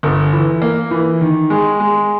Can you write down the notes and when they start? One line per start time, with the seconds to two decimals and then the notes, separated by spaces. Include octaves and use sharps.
0.03 G1
0.33 E3
0.62 A#3
0.91 E3
1.21 D#3
1.50 G#3
1.80 G#3